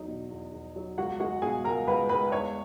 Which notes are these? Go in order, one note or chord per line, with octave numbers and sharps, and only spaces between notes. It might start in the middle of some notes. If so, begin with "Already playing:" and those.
Already playing: E2 F#3 D#4
B2
E2
E2
F#3
C#2 F#4 F#5
G#3 F#4 F#5
B2 G#4 G#5
C#2 A#4 A#5
C#2 B4 B5
G#3 B4 B5
E2 C#5 C#6